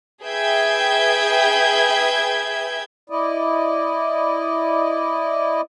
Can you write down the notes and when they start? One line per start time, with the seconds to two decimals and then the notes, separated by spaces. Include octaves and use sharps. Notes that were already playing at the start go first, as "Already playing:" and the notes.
0.24 G#4 B4 E5 G5 G6 G#6
3.10 E4 D5 D#5